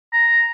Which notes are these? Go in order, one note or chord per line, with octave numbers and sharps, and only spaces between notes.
A#5